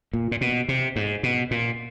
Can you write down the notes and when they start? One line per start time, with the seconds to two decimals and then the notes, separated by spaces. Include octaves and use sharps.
0.13 A#2
0.32 A#2
0.41 B2
0.68 C3
0.96 G#2
1.23 B2
1.51 A#2